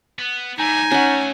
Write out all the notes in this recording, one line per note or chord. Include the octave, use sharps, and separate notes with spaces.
B3
G3 A3 D#4 G#5
A3 C#4 D4 F#5